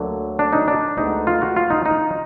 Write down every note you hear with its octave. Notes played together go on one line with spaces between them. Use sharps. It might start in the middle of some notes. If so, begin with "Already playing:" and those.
Already playing: D2 D3 F#3 A#3
D4
D#4
D4
D2 D3 G#3 B3 D#4
F4
F#4
F4
D#4
D#4